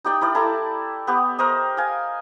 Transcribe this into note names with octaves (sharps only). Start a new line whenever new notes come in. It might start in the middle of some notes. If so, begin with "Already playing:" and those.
D#4 G4 D5 G5
E4 A#4 D5
E4 A4 A5 A#5
B3 G4
A#4 C5 D#5
F5 G#5